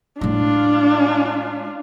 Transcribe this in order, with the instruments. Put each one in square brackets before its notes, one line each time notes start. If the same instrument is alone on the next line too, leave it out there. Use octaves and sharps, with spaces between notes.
[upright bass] A2 G#3 [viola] D4 F4